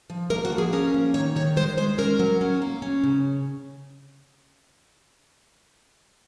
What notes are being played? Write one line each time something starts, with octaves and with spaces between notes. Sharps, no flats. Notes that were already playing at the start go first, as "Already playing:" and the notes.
F3
A#3 A#4
F#4
F3
G#4
C#4 A#4
A#3
D#3 C#5
D#3 C#5
G#3 C5
G#3 C5
C#4 A#4
F#3
C#4
A#3
C#4
C#3